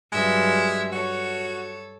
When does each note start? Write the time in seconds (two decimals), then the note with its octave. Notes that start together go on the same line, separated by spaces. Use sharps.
0.12 G2 F#3 G#3 E5
0.92 F#4 A4 C#5